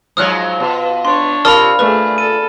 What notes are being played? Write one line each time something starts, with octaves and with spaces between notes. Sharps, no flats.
G#2 F3 F#3 D#6 F6 F#6
B2 F4
D4 C#5 C6
C3 F4 A#4 D5 A5 B5 D#6 F6
A#2 A3 G#4 B4
A4 D#7